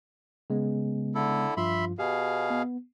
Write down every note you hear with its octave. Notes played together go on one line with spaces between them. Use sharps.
C#3 G#3 B3
D3 E4 A4
G2 F3 F4 E5 B5 C6
B2 G4 G#4 F5
B3